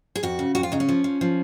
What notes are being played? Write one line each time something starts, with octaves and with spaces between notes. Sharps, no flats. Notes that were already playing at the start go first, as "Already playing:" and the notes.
G#4
F2 F#4
C#3
F2 F#4
F4
C#3 D#4
C#4
F3
F3
F3